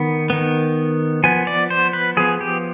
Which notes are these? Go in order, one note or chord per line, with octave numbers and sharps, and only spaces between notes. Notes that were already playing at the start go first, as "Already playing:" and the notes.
Already playing: D#3 B3
D#3 B3
F3 B3 G#5
D5
C5
B4
F3 B3 G#4
G4